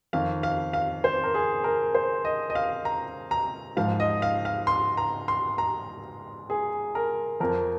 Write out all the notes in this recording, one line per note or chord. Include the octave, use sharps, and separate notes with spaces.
F2 D#3 F5
F5
F5
C5
A#4
G#4
A#4
C5
D#5
D#5
F5
A#5
A#5
G#2 F3 F5
D#5
F5
F5
C6
A#5
C6
A#5
G#4
A#4
F2 F3 A#4